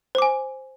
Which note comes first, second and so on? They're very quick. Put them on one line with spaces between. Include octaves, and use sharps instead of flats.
C5 D6 G#5